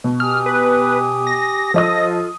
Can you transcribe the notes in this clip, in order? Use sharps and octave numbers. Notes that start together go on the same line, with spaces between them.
B2
G4 G#5 D#6 F6
B4
A#6
F3 F4 A4 D#5 D#6